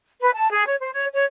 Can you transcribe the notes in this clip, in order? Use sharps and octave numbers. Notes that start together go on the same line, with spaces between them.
B4
A5
G#4
C#5
C5
C#5
C#5